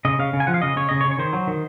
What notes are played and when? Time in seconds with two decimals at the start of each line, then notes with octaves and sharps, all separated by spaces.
0.05 C#3 D#5
0.19 C#3 F5
0.33 C#3
0.40 G#5
0.47 F3 F#5
0.54 F5
0.62 C#3 D#5
0.77 C#3 C#5
0.89 C#3 D#5
1.01 C#5
1.05 C#3
1.11 C#5
1.18 D#3 C5
1.33 F#3
1.47 D#3